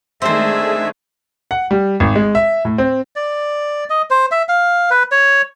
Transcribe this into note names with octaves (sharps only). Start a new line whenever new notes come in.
D#3 G#3 A3 C4 D4 G#4 C5 E5
F#5
G3
G#1
G#3
E5
A2
C4
D5
D#5
C5
E5
F5
B4
C#5